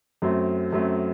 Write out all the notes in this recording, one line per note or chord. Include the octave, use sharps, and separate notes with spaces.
F#2 F#3 A3 C4
F#2 F#3 A3 C4